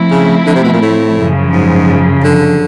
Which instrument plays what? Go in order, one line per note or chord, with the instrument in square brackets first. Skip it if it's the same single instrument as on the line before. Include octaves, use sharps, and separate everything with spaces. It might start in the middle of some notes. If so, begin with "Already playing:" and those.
Already playing: [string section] F3 A3 C4 E4
[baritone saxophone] C#3
D3
C3
B2
A#2
A2
[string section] F#2 C#3 F3
[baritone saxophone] G#2
D3